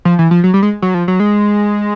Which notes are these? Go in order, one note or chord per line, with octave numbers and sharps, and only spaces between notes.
F3
E3
F3
F#3
G3
G#3
F#3
F3
F#3
G#3